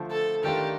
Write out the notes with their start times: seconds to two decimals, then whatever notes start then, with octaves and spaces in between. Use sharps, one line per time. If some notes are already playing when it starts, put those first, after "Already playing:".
Already playing: D3 F3 A3
0.11 A4
0.44 D#3 A3 D4 F4 G4 A#4